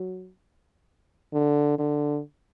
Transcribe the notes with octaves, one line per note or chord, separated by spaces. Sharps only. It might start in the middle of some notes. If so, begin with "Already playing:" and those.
Already playing: F#3
D3
D3